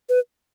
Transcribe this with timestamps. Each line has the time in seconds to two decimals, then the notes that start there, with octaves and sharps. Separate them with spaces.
0.09 B4